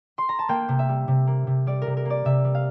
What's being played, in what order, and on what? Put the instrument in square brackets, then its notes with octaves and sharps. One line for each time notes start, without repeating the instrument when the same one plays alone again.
[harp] C6
A#5
A5
A#3 G5
C3
E5
G3
C3
A#3
C3
G3 D5
A#4
C3
A#4
A#3 D5
C3 E5
G3
F5